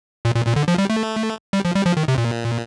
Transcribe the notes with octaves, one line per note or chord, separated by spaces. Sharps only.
A#2
A#2
A#2
D3
F3
G3
A3
G3
F3
G3
F3
D#3
C3
A#2